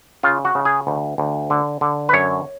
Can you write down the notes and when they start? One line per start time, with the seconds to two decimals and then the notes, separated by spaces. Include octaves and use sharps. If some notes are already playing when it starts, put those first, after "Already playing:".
0.23 C#3 F4
0.45 F#4
0.55 C#3
0.65 G#4
0.87 D2
1.18 D2
1.50 D3
1.81 D3
2.09 B4
2.13 F#2 C#5